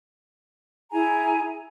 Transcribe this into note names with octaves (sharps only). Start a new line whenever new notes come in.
E4 G#4 G#5 A#5